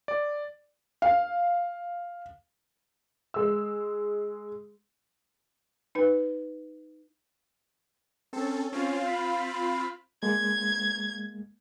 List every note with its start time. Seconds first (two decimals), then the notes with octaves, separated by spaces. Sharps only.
0.08 D5
1.02 F5
3.34 G#3 E6
5.95 D#4 B4
8.33 C4 C#4 A4
8.72 C4 C#4 F4 F5
9.08 B5
10.23 G#3 A#3 G#6